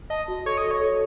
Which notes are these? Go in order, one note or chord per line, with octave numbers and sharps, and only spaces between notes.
D#5 A5
F#4
A4 C#5
D#5
F#4
C#5
A4